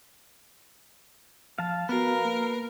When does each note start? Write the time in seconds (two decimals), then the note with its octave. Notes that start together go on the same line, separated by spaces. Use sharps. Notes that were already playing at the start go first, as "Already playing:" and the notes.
1.58 F3 F5 A5
1.89 B3 F#4 A#4 B4 F5
2.25 A#3